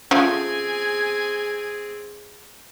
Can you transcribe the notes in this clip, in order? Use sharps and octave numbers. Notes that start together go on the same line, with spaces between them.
F3 A3 C4 C#4 F4 G#4 G#5